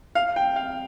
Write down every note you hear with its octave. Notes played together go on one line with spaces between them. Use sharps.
F5
G5
F5